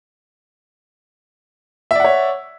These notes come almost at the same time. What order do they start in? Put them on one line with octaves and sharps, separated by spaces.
E5 D5 F#5 C#5